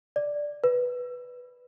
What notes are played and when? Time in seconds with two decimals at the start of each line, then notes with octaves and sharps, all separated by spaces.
0.16 D5
0.64 B4